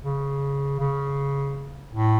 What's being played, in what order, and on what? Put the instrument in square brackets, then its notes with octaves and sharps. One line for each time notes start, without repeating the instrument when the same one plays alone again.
[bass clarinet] C#3
C#3
A2